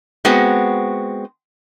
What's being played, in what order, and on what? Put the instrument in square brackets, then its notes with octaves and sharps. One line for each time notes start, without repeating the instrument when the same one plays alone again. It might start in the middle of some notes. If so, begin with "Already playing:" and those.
[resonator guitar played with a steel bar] G#3 B3 C4 F#4